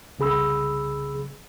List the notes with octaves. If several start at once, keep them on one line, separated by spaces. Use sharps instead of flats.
C2 C#3 G#4 B5 E6